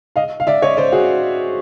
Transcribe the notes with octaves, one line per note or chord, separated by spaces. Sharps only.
D#5 F5
F5
D5 E5
C#5 D#5
C5 D5
F#4 G#4